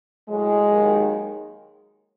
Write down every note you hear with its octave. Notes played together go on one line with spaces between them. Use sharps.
A2 F#3 G#3
D#2 D#3 F#3